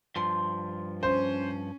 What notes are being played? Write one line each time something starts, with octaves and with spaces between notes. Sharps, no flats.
G2 F3 C6
C#4 C5